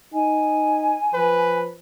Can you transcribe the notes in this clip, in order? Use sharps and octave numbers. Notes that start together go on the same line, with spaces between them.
D#4 G#5
F3 B4